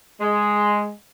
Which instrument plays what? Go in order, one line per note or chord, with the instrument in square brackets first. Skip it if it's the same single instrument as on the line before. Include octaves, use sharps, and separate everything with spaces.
[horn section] G#3